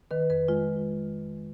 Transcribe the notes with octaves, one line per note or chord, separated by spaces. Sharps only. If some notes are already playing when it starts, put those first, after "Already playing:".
D#3 B4
F2 B4
G#3 F4